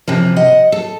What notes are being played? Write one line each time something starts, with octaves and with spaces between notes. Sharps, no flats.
C3 E3 F3
D#5 F#5
A4